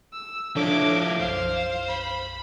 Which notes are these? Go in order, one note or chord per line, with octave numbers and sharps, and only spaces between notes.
E6
F3 D4 E4 A4 C#5 D6
B1 F#2 C5 F5
B5